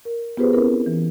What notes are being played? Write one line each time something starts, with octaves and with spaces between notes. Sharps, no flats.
A#4
B3 F4 G4 G#4 B4 C5
C4 C#4 E4 A#4 B4
E3